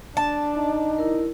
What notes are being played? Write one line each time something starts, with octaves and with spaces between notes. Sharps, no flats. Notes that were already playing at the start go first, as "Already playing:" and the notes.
D4 A5
D#4
E4 A#4